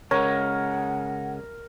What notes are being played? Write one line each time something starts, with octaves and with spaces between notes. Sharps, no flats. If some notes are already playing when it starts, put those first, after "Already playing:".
C#3 G#3 C#4 A#4 C#5 F#5